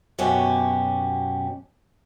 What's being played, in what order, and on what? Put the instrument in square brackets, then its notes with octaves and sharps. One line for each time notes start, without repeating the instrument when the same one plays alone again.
[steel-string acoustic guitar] F#2 B2 C#4 F#4 G4